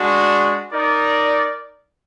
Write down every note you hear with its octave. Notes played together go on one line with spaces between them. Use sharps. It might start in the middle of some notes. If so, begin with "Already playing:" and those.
Already playing: G#3 D4 F#4
D#4 A#4 D5